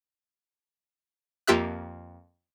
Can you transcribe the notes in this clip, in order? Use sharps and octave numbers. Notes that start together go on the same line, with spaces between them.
F2 A#3 F4 G4 E5 F#6